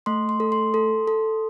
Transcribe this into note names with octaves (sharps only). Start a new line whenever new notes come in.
A3 C6
C6
A4
C6
A4
A4